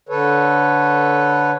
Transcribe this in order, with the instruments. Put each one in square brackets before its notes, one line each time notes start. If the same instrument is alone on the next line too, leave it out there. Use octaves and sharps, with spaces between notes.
[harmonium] D3 A4 B4 C#5